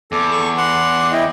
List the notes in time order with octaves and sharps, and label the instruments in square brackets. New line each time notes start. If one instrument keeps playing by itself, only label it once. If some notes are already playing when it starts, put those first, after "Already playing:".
[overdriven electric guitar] E2 [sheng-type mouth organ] A4 [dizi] D6
[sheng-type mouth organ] A4 C#6
[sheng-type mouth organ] F#5 C6 [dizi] D6
[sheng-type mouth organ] E4 D#5 [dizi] G5